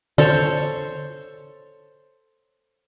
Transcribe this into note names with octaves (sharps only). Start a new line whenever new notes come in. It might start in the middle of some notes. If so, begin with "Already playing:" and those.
D3 A4 C5 C#5